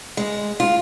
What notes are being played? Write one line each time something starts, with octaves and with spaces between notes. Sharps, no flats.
G#3
F4